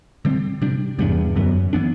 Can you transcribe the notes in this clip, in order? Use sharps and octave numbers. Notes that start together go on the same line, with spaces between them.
D3 G3 C4
C3 G3 D4
E2 G2 C3 G3 B3 D4
F#2 D3 F#3 B3
E3 B3 D4